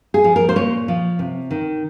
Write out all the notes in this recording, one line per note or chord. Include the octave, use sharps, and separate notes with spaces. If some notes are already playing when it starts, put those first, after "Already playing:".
G#4
F3
A#4
C5
A#2 C#5
F3
C3
D#3